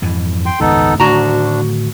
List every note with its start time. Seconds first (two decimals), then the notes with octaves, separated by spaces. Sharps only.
0.02 F2 G#2 E3
0.46 G5 C6
0.60 G#1 C#2 F#2 B3 D#4 A4
1.00 D2 A2 D3 D#3 D4 F#4 A#5